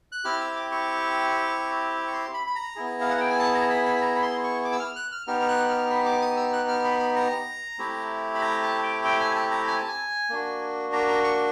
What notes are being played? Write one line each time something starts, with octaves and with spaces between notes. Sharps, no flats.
F#6
C4 E4 G4 F6
E6
D6
C#6
C#6
C6
B5
B5
A#5
B3 E4 G#4
F5
F#5
G5
G#5
A5
A#5
B5
B5
A#5
B5
C6
C#6
D6
E6
F6
F#6
F6
B3 D#4 G4 F6
F6
F#6
F6
B5
D6
D#6
E6
F#6
F6
B5
B5
A#5
A3 C4 E4 G4
B5
A#5
A5
G5
G5
G#5
A5
A#5
G#5
A5
G#5
A#3 D4 F#4
A#5
A#5
C#6